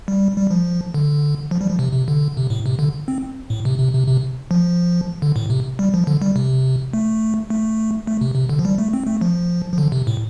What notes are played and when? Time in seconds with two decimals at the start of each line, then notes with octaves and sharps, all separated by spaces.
0.08 G3
0.37 G3
0.51 F3
0.94 D3
1.51 F3
1.61 G3
1.70 F3
1.79 C3
1.93 C3
2.08 D3
2.37 C3
2.50 A2
2.66 C3
2.79 D3
3.08 C4
3.50 A2
3.65 C3
3.79 C3
3.94 C3
4.08 C3
4.51 F3
5.22 D3
5.36 A2
5.50 C3
5.79 G3
5.94 F3
6.07 D3
6.22 G3
6.36 C3
6.93 A3
7.50 A3
8.07 A3
8.21 C3
8.35 C3
8.49 D3
8.59 F3
8.65 G3
8.78 A3
8.93 C4
9.07 A3
9.21 F3
9.73 F3
9.78 D3
9.92 C3
10.07 A2